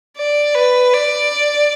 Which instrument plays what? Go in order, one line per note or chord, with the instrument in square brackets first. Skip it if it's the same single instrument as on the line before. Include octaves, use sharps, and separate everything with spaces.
[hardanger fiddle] D5
B4
D5